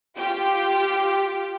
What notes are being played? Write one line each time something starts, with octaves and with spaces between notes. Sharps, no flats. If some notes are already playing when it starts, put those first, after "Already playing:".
F4 G4 G5